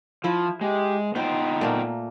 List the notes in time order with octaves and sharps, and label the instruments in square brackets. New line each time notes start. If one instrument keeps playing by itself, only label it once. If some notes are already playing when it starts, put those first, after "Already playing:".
[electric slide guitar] F3 [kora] E4 [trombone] F4
[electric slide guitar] G#3 [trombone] G4
[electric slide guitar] B3 F4 G5 [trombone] D#4 [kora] C5
[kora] A#2 A3 A#3